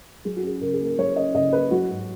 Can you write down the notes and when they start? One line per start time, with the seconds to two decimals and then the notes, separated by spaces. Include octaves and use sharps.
0.25 F#3 G#4
0.36 F#4
0.43 C#4 G#4
0.61 C#3 A#4
0.73 G#4
0.80 A#3 A#4
0.98 F#3 C#5
1.16 C#4 D#5
1.34 C#3 D#5
1.53 A#3 B4
1.71 F#3 F#4
1.89 G#2